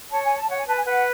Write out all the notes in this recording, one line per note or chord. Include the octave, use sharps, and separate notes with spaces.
C#5 A5
G#5
A5
C#5 F#5
G#5
B4 A5
G#5
B4 F#5